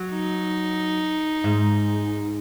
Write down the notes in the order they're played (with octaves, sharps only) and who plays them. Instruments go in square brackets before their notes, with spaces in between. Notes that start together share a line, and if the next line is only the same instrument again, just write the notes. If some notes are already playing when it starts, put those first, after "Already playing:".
Already playing: [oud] F#3
[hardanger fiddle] D#4
[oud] G#2